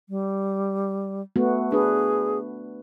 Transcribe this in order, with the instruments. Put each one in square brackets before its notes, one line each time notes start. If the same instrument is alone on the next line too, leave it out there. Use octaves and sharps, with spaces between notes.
[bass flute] G3
[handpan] A3 B3 F#4
[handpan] D4 B4 [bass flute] G#4